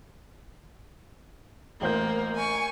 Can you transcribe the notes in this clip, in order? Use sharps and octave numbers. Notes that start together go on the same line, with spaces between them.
A1 A#3 C5 G6
G#5 C#6